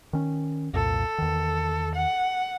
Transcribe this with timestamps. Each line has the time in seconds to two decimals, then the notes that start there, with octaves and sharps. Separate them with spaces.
0.13 D#3 C#4
0.73 C2 F2 A#2 A4
1.18 E2 D#3
1.95 F#5